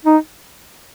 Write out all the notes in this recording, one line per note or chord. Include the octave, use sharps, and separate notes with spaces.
D#4